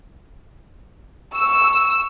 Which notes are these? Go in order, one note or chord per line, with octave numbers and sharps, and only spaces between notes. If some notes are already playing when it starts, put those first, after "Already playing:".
C#6 E6